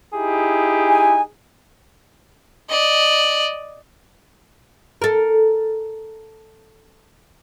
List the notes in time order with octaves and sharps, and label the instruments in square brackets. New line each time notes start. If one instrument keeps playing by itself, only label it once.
[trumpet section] D#4 E4 G4 [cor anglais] G#4
[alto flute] G#5
[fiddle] D5 D#5
[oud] A4 A#4